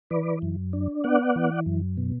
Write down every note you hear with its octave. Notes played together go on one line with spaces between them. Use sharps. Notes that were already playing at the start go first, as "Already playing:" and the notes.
E3 B4 D5
F#2
D4
B3 D5 F#5
E3
F#2
B2